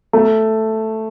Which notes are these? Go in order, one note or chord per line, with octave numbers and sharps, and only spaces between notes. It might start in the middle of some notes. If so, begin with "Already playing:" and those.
A3